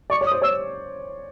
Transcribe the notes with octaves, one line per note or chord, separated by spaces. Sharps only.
D5 C#6
C#5
D#6
C5
C#5 E6